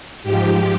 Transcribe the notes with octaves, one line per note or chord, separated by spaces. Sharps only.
G#2 F3 G4